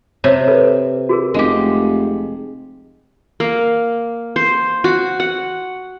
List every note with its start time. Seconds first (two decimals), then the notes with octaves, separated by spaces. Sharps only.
0.24 C3 C#5
0.48 A4 B4
1.09 F#4 G#4 A#4
1.34 F1 G#3 G4
3.40 A#3
4.36 C5
4.84 F#4
5.20 F#5